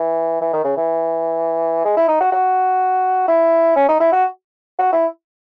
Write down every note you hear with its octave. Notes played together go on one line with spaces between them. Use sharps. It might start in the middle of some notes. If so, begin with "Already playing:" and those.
Already playing: E3
E3
D#3
C#3
E3
G#3
E4
D#4
F#4
F#4
E4
C#4
D#4
E4
F#4
F#4
E4